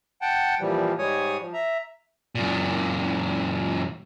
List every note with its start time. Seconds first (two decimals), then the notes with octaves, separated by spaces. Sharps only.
0.22 F#5 G5 A5
0.60 A#2 E3 F3 G3
0.99 G#2 G3 G#3 C#5 G#5 D#6
1.41 F3
1.53 E5 A#5
2.35 F#2 A#2